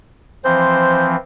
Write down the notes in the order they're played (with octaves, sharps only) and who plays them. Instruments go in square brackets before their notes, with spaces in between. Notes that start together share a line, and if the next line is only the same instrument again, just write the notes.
[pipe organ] E3 F3 C4 [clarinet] C5